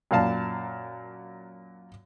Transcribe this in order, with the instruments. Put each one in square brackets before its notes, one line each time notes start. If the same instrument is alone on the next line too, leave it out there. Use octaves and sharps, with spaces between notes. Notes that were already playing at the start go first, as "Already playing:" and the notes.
[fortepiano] F#2 A#2 F5 A5